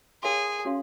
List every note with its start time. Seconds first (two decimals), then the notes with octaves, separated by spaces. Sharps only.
0.23 D#4 G#4 A#4 C#5 F5 C6
0.65 C#4 F#4 C#5 F5 C6